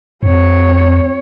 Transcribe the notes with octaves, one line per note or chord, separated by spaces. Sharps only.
F2 C4 C#5